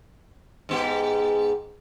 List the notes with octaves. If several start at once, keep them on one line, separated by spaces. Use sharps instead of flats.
G#2 B3 G4